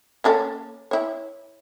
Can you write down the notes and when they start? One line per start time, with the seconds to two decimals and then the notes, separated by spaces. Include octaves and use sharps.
0.24 A#3 C#4 A4
0.91 E4 C#5